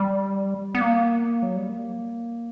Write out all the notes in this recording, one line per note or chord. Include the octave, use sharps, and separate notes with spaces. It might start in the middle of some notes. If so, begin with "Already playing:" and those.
Already playing: G3
B3
A#3
F#3
G3
A#3